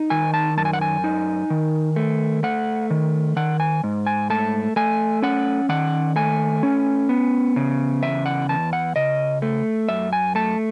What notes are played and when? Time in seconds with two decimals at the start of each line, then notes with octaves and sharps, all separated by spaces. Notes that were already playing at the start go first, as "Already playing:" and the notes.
Already playing: D#4
0.10 D#3 G#5
0.34 A5
0.57 F#2 A5
0.65 G#5
0.73 F#5
0.81 G#5
1.04 D#4
1.50 D#3
1.96 A3
2.43 A3 F#5
2.90 D#3
3.36 D#3 F#5
3.60 G#5
3.83 G#2
4.07 G#5
4.30 A3 A5
4.76 A3 G#5
5.22 C#4 F#5
5.69 D#3 F#5
6.16 A3 G#5
6.63 C#4
7.09 B3
7.56 C#3
8.02 E2 E5
8.26 F#5
8.49 E2 A5
8.73 F#5
8.96 C#3 D#5
9.42 A3
9.89 F#2 E5
10.13 G#5
10.35 A3 A5